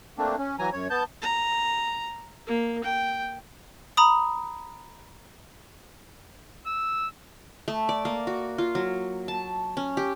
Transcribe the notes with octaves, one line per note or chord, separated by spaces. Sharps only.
A3 A#3 C4 D4
C#4
E3 F#3 G#5 A#5
F#2 C#5
B3 A5 G6
A#5
A#3
G5
A#5 B5 D#6
E6
A3
D5
A#3
F#4
F4
F#3
A5
C#4
G4